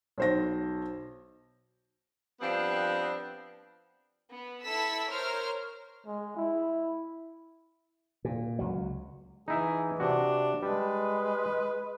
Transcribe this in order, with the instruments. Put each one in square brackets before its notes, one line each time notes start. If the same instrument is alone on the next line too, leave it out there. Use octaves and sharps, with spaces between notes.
[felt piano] B1 C5 A#6
[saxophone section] F3 G3 B3 C4 D4
[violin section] B3
E4 A4 E6 B6
A#4 C5 C#5 F6
[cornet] G#3
E4
[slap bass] A#2
C#2 F#3
[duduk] E3 [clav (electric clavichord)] D#4 E4 E5 [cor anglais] G#4
[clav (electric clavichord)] C3 F#4 [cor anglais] D4
[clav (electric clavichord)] G3 A5 [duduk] G#3 [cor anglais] B4